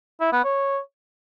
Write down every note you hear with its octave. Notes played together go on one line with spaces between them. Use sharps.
E4
B3
C#5